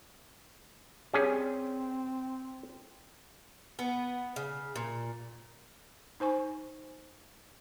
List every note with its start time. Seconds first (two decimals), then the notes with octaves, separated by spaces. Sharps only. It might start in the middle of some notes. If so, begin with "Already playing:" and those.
1.13 G3 C4 C#4 G#4
3.79 B3
4.36 C#3
4.76 A#2
6.20 D#4 C5 G#5 C#6